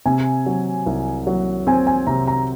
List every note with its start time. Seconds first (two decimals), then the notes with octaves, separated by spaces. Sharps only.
0.06 C3 G#5
0.46 F#3
0.86 C2
1.27 F#3
1.67 C4 G#5
1.87 G#5
2.07 C3 A#5
2.27 A#5